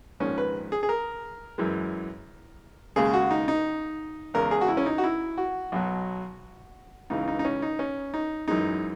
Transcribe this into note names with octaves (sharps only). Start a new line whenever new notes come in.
A#1 G#2 D#3 C#4
B4
G#4
G#4
A#4
F#2 E3 G#3
D#2 C#3 G#3 G#4
F#4
D#4
D#4
E2 C#3 G#3 A#4
G#4
F#4
E4
C#4
D#4
F#4
E4
F#4
B1 B2 F#3
C#2 C#3 E3 D#4
D#4
D#4
C#4
D#4
C#4
D#4
F#2 E3 G#3 D#4